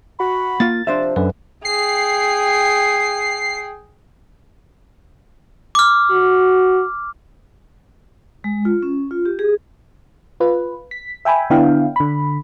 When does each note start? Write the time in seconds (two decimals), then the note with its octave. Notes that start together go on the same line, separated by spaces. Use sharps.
0.20 F#4 B5
0.60 A#3 F4 A6
0.87 C3 F3 D4 C5 E5
1.16 F#2 D3 B4
1.65 G#4 G5 C7
5.75 D6 F6
6.11 F#4
8.44 G#3
8.65 F4
8.83 C#4
9.11 F4
9.26 G4
9.39 G#4
10.40 F4 B4
10.91 B6
11.25 E5 G5 G#5 B5
11.50 D3 B3 D4 E4 F5 G5
11.96 D3 B5